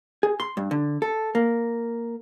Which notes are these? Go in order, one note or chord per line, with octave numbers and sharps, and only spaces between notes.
G#4
C6
G2
D3
A4
A#3